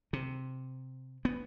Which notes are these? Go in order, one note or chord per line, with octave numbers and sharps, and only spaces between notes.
C3
B3